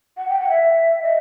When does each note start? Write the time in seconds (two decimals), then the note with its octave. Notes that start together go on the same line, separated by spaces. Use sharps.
0.17 F#5
0.28 G5
0.38 F#5
0.49 E5
1.02 D#5